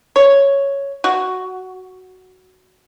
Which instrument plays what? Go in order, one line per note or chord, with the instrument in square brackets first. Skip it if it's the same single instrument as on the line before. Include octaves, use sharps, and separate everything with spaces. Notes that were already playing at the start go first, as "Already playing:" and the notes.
[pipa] C#5
F#4